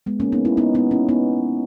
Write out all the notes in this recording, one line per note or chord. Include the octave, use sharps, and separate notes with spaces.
G#3 B3
A#3 C#4
B3 D#4
C#4 E4
B3 D#4
B3 D#4
C#4 E4
B3 D#4